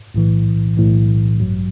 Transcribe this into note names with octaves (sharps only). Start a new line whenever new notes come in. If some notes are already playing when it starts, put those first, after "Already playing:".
B1 A2 E3
B1 A2 E3
A1 G2 F#3